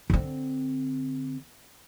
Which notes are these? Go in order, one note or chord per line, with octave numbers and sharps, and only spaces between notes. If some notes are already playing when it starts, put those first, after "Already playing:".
D3 C4